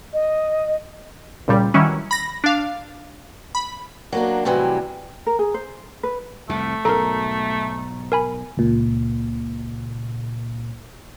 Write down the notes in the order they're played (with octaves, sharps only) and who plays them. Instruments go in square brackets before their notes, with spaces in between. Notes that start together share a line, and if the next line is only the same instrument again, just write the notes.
[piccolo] D#5
[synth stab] C#2 A#2 G3
D#3 E3 F#3 G3 C#4 E4
B5 A#6
D4 F5
B5
[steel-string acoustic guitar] F#3 A#3 D4
A2 C3 E3 F#3 G3
[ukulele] A#4
G#4
C5
B4
[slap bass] C2 F2 C3 [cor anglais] A3
[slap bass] B1 G#2 [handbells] A4 A#4 [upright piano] A#5
[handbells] A#4 G#5 B5
[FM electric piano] C#2 A#2